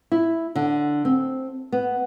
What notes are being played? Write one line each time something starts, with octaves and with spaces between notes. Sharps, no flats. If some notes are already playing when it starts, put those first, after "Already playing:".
E4
D3
C4
B3